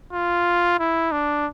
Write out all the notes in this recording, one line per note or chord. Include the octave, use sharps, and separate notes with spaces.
F4
E4
D4